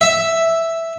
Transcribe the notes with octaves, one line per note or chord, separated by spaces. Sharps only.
E5